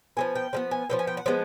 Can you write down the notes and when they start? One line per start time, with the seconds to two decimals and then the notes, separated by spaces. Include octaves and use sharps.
0.17 F3 G#3 B3 G#5
0.36 G5
0.53 F3 G#3 B3
0.71 G#5
0.90 F3 G#3 B3 G5
0.99 G#5
1.07 G5
1.17 F#5
1.26 F3 G#3 B3